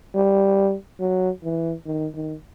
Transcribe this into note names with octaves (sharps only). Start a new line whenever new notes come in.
G3
F#3
E3
D#3
D#3